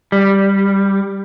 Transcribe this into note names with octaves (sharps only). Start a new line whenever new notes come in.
G3